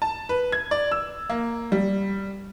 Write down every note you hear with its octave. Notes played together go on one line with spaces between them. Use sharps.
A5
B4
G#6
D5
E6
A#3
G3